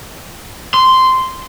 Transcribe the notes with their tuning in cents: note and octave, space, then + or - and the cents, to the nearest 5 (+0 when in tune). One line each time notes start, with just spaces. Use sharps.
C6 -10